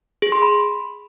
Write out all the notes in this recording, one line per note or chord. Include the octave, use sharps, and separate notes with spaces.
G#4
C6
B5